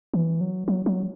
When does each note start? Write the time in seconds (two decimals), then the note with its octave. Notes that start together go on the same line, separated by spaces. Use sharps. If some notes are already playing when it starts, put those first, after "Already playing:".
0.14 E3
0.41 F#3
0.68 F#3
0.86 F#3